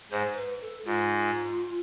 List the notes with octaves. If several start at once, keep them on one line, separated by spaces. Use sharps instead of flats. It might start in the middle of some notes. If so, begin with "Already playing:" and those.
G#2 C5
C5
B4
A4
G#2 F4